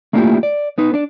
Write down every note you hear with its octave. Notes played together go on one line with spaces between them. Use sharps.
A3 A#3 D4 E4 F4 G4
D5
B3 D#4 B4
D4 D5